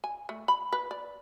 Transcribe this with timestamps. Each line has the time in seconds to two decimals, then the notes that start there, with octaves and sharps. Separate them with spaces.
0.04 G#5
0.29 A3
0.48 B5
0.73 B4
0.91 D5